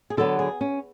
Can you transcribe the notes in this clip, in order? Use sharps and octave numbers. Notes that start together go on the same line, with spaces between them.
G#4
D3 F#3 B3 A4
G#4
C#4